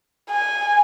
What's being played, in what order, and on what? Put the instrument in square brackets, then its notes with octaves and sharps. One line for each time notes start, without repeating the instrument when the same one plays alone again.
[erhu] G#5